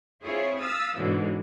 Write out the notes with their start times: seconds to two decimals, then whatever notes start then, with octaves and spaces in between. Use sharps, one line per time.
0.23 C4 E4 F4 G#4 C#5
0.58 F5 D#6 E6 A6 B6
0.96 G#2 B2 D3 E3 F#3